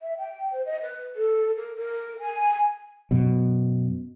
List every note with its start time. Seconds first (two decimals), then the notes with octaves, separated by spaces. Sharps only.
0.02 E5
0.18 G5
0.53 C5
0.66 D#5
0.82 B4
1.16 A4
1.56 A#4
1.76 A#4
2.20 G#5
3.11 F#2 B2